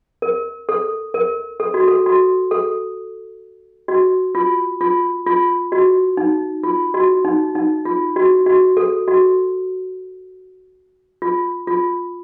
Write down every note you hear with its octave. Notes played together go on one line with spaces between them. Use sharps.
A#4
A4
A#4
A4
F#4
A4
F#4
A4
F#4
F4
F4
F4
F#4
D#4
F4
F#4
D#4
D#4
F4
F#4
F#4
A4
F#4
F4
F4